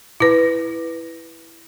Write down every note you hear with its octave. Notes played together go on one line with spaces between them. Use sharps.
E4 B4